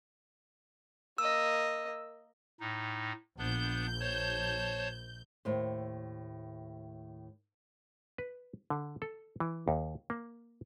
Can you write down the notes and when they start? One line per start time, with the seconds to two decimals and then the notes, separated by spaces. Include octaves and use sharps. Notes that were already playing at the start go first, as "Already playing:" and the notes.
1.18 A#3 D#5 E6
2.60 A2 D#4
3.39 A#1 B3 D4 G6
4.00 C5 C#5 A5
5.45 D#2 A2 C5
8.18 B4
8.70 D3
9.02 A4
9.40 E3
9.68 D#2
10.10 A#3